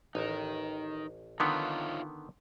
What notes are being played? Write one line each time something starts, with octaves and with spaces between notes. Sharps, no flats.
A1 D#4 A#4
D3 D#3 B3 D#4 F4 C#5